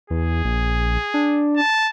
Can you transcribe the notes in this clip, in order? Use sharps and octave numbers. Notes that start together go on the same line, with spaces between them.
E2 G#4
A#1
D4
A5